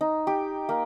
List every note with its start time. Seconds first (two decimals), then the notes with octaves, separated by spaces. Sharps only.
0.01 D#4
0.27 G4
0.69 A#3